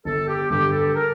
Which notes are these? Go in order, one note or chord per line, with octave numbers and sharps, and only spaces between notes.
G1 A4
G4
G2 D3 G3 G4
A4
A#4